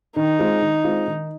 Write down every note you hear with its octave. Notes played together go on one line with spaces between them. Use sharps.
D#3 D#4
G#3 C4 F4
D#3
G#3 C4 F4
D#3